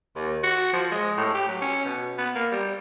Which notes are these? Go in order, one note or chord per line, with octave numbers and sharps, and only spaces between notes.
D#2
F#4
F3
G#3
A2
G4
F#3
C#4
B2
B3
A#3
G3